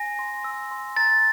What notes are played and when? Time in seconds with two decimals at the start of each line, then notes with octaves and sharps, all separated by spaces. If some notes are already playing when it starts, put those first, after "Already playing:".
Already playing: G#5 A#6
0.19 C6
0.44 E6
0.71 C6
0.97 A#5 A6